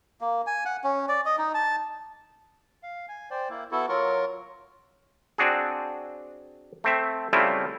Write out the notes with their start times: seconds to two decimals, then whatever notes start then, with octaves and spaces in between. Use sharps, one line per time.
0.21 A#3
0.47 G#5
0.65 F#5
0.84 C#4
1.09 D5
1.26 D#5
1.38 D#4
1.54 A5
2.83 F5
3.08 G#5
3.31 C5 D5 G5
3.50 A#3 E4
3.71 B3 E4 F#4 A4
3.89 F#3 F4 A#4 C#6
5.38 C4 D4 F#4 G#4
6.84 A3 C4 E5
7.33 C#3 G3 A3 C4 E4 F4